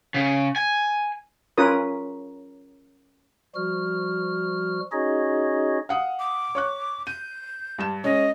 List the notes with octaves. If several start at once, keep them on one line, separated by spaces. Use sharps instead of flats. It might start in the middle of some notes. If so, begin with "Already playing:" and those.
C#3 C#4
G#5
C#4 F4 A#4 B4 D#6
F3 G3 F#4 F6
C#4 D#4 F#4 G#4 C#5 D#5
F5 F#5 D#6
D6
C#5 C#6 F#6
G6 D#7
G2 A5 E7
G#3 C#4 D#5